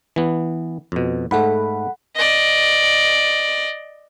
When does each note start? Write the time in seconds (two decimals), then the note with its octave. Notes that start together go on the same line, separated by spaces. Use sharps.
0.16 E3 B3
0.92 F2 B2
1.31 G#2 A3 A4 F#5 B5
2.16 D5 D#5